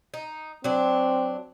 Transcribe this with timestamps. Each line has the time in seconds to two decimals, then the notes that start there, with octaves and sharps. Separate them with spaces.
0.14 D#4
0.64 F#3 C4 D4